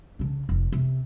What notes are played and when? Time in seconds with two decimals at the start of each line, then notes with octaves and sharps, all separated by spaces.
0.19 C#3 D4
0.49 F1
0.73 C3